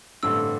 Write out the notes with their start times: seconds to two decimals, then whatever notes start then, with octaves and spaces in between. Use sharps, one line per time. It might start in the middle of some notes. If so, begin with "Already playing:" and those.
0.23 A1 G2 D3 A3 C4 E6